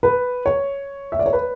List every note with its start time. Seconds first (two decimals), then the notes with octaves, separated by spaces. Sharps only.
0.03 B4
0.46 C#5
1.12 E5
1.19 D5
1.26 C#5
1.33 B4